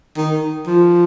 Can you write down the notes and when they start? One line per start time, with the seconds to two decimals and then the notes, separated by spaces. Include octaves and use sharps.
0.17 D#3
0.67 F3